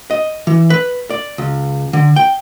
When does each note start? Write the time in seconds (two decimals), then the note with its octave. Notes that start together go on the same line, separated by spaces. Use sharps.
0.11 D#5
0.47 E3
0.70 B4
1.10 D5
1.38 C#2
1.93 D3
2.16 G5